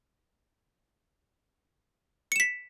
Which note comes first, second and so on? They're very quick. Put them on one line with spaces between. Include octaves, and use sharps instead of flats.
C#7 E7 B6